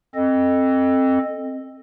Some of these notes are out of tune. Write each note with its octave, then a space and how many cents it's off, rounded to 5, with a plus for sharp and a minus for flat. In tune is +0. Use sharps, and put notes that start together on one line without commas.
C4 +20 A4 +0 D#5 -10